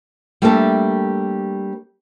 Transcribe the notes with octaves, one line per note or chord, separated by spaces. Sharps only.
G3 A3 A#3 C4 D4 A4